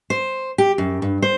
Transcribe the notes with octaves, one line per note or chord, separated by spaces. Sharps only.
C5
G4
F#2
G2
C5